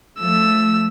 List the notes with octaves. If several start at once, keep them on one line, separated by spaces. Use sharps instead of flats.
F3 A3 E6